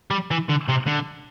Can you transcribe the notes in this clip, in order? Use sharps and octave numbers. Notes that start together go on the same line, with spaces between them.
G3
E3
D3
C3
D3